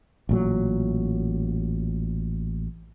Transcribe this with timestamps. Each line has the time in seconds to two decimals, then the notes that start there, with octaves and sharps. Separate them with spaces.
0.29 A1 A#2 F#3